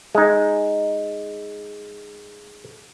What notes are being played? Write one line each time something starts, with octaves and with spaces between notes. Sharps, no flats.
G#3 D#4